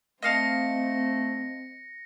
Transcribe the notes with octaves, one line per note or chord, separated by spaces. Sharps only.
A3 C4 D#5 F5 A5 A#6 C#7